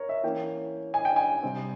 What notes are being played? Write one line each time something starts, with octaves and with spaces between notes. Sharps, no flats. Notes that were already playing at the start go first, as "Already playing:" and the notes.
Already playing: A#4 C#5
E5
E3 A#3 C#4 G5
G#5
G5
G#5
C3 G3 C4